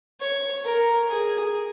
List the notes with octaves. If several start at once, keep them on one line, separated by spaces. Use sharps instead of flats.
C#5
A#4
G#4